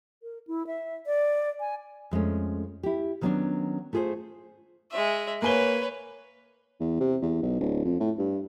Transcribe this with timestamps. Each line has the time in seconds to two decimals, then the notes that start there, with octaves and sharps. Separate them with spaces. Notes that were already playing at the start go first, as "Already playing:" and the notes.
0.23 A#4
0.47 E4
0.67 E5
1.06 D5
1.60 G#5
2.11 F2 G#3 A3 C#4
2.83 E4 G4
3.21 D#3 F#3 A#3 B3 C#4 D4
3.93 A3 F4 G#4 A#4 C5
4.91 G#3 E5
5.42 A#3 B4 C#5 G#5 G7
6.80 E2
7.00 C3
7.22 E2
7.42 B1
7.60 D1
7.84 F2
8.00 A2
8.18 G2